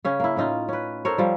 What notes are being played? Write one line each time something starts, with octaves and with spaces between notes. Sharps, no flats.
C#3 C#4
A#3 E4
A2 C#4 D#4 F4
C#4 B4
A4 A#4 C5 C#5
F3 G3